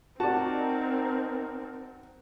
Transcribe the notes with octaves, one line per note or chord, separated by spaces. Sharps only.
C4 D#4 F#4 A#4 D5 A5